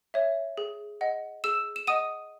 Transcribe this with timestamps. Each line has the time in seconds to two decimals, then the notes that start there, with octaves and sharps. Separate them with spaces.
0.14 C#5 E5
0.58 G#4
1.01 D#5 F#5
1.44 G#4 E6 E7
1.76 E7
1.87 D#5 F#5 D#6 D#7